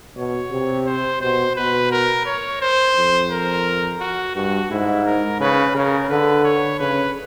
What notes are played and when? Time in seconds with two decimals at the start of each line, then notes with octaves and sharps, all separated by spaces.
0.16 B2 C#5
0.51 C3
0.86 C5
1.21 B2 C5
1.56 B2 B4
1.91 A#4
2.26 C#5
2.61 C5
2.96 F2
3.31 A#4
4.00 F#4
4.35 G2 F#4
4.70 G#2 E4
5.06 A#4
5.40 C#3 B4
5.74 C#3 A#4
6.09 D3 B4
6.44 C#5
6.79 C#3 B4